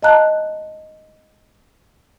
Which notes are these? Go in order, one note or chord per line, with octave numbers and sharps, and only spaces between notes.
D#5 F5 A5 A#5 F#6